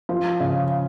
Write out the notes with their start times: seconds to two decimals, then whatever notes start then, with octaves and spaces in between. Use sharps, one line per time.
0.09 F3
0.40 C#3